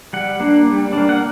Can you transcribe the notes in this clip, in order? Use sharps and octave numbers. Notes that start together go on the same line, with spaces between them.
G3 F#5
A#3 D4
G3
A#3 D4
F#5